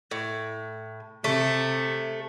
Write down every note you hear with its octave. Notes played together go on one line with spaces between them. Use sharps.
A2
C3 A3